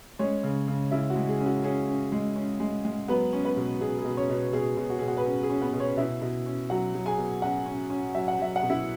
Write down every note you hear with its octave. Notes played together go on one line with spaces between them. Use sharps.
G#3 C#4 C#5
C#3
C#3
C#3 E4 E5
F#4
G#3
G#4
C#4
F#4
C#4 G#4
C#4
G#3
C#4
G#3
G#3
F#3 B3 B4
C#4
B3 B4
B2
B2 G#4
G#4
B2
C#4 C#5
B2
B2 G#4
B2
F#4
B2 G#4
F#4
B4
C#4 G#4
G#4
C#4
B3 B4
B2
C#4 C#5
B2 E4 E5
B2
C#4
F#3 F#4 F#5
F#3
G#4 G#5
B2
C#4 F#4 F#5
C#4
C#4
F#3 E5
F#5
F#3 E5
F#5
B2
E4 E5